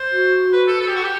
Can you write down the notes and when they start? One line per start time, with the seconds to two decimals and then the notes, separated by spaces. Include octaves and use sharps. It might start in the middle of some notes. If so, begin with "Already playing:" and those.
Already playing: C5
0.12 F#4
0.53 B4
0.68 A4
0.81 A4
0.88 G4
0.96 F#4
1.04 G4